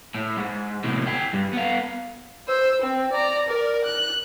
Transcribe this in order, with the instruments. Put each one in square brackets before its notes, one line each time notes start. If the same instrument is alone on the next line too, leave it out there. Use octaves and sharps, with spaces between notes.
[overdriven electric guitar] A2
G#2
A2 C3
G#4 G5
G2
B3 F5
[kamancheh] C5 E6
C4
D5 A#5
A#4 D5
F#6